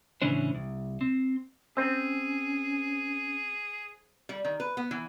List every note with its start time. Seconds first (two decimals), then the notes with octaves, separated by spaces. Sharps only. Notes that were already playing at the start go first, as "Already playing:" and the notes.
0.22 A2 C#3 E3 C#4 D4 C5
0.55 C2
1.01 C4
1.77 C4 C#4 G#4 C5 E6
4.29 G3
4.45 D#3
4.60 B4
4.77 B3
4.91 E3